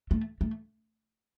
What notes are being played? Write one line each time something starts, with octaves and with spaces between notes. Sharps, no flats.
A3
A3